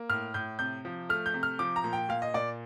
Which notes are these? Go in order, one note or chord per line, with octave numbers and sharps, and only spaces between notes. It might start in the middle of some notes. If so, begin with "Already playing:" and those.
Already playing: A#3
A2 F6
A2 G6
C3 G6
F3
A3 F6
G6
C3
F6
F3 D6
A#5
A#2
G5
A#2 F5
D#5
A#2 D5